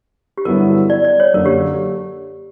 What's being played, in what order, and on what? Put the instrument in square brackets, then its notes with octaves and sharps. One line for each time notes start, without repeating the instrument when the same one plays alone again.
[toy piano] G4
[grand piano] G2 D3 F#3 B3 E4 [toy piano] A#4
[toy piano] D5
D5
C#5
[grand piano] F#2 D3 A#3 [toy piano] A#4
[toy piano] G4